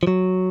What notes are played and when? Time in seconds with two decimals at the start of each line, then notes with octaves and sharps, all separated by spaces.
0.03 F3
0.07 F#3